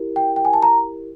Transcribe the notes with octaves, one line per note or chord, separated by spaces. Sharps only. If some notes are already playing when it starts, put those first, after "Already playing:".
Already playing: E4 G4 A#4
G5
G5
G#5
A5
A#5